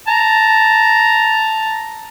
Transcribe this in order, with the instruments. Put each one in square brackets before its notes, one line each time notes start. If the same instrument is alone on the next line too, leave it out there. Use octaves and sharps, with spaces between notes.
[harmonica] A5 A#5